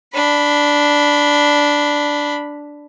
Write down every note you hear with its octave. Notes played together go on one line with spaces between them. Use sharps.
D4 B5